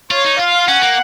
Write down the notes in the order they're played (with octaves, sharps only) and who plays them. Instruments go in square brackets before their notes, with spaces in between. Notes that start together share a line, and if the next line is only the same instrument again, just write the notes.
[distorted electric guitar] F4 [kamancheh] C#5
[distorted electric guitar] D#4
[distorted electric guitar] F4 [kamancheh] F5
[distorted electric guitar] C#4 [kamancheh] F#5
[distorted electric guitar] A#3